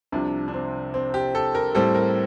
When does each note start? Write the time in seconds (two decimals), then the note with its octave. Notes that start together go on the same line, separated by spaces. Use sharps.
0.12 C2 C3 F3 D4
0.48 D4
0.54 C4
0.94 C4
1.14 G4
1.35 A4
1.55 A#4
1.75 A2 G3 C4 A4
1.95 A#4